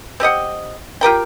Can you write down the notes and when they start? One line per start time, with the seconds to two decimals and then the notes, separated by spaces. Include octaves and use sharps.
0.20 C4 G4 D#5 F#5
1.01 F4 G4 A#4 G5